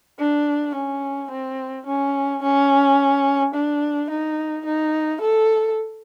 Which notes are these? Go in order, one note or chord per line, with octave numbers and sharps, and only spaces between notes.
D4
C#4
C4
C#4
C#4
D4
D#4
D#4
A4